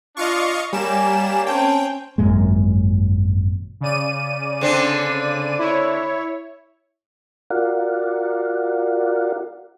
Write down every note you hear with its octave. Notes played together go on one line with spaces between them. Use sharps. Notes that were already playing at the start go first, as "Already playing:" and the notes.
D4 F4 D5 D#5 F5 C#6
G3 A#3 D4 C#5 G#5 E7
C4 C#4 G5 A5
G#1 F#2 A#2 G#3
C#3 D5 D#7
D3 C4 D4
E4 C#5
F4 F#4 A#4 D5 F5 F#5